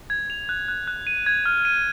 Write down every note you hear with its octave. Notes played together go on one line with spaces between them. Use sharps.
G#6
F7
F#6
F#6
F#6
D#7
G#6
F6
D#7